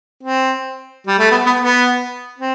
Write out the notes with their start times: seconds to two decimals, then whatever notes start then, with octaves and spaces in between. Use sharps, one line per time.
0.23 C4
1.07 G3
1.19 A3
1.31 B3
1.46 B3
1.62 B3
2.38 C4